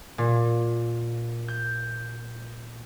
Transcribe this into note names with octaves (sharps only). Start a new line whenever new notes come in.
A#2
G6